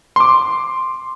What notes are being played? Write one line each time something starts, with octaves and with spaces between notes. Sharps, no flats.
C6 D6